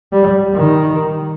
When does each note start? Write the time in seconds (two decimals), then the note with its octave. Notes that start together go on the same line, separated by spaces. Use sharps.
0.12 G3
0.56 D#3